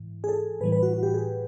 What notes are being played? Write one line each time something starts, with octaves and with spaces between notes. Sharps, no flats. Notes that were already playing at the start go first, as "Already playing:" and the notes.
Already playing: G#2 E3
G#4
A4
A2 E3 G3 B4
B4
F#4
F#4
G4
G#4